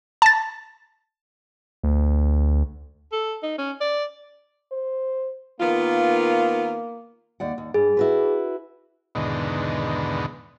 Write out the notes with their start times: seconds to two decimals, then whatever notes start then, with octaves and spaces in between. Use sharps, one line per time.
0.22 A5 A6
1.83 D2
3.12 A4
3.43 D#4
3.58 C#4
3.81 D5
4.72 C5
5.61 D#3 A#3 B3 F4
7.40 D#2 D5 F#5
7.58 D#2
7.74 G2 G#4
7.97 E4 F#4 B4
9.15 E2 G#2 B2 D3 D#3